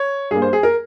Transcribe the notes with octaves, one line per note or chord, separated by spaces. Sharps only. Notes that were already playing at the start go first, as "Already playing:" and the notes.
Already playing: C#5
G2 G3 A#3 G#4
C5
G#4
A#4